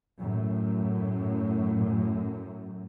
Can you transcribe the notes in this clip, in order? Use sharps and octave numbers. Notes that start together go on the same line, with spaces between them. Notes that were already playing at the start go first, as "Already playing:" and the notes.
F#2 A2